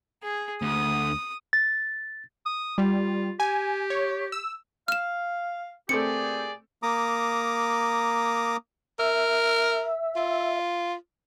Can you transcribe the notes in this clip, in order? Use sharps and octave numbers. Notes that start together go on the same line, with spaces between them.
G#4
D2 D#6
A6
D#6
G3 F4
G4 G#5
C#5
E6
F5 F6 E7
A#2 A3 C4 G4 G#4 D5 C#7
A#3 A#5 D6 D#6
A#4 E5
F4